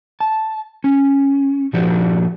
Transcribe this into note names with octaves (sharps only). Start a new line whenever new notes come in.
A5
C#4
A#2 F3 D4 F#4 G4